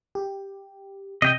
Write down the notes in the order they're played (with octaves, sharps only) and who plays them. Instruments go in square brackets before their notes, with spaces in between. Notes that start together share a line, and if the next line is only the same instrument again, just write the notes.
[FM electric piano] G4
[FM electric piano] C3 [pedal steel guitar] D#5 G5